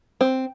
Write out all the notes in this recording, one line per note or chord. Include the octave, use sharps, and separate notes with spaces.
C4